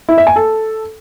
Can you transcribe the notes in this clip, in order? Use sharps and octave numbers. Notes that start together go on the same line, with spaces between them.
E4
E5
G#5
A4